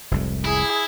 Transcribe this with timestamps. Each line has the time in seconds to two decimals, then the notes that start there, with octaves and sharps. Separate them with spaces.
0.11 F1 C2 G#2
0.45 E4 G#4